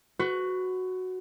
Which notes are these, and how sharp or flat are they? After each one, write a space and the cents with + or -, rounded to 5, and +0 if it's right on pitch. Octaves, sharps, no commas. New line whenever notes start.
F#4 +0 B4 +35